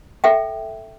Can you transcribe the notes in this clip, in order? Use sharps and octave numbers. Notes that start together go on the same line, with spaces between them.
A4 E5 G5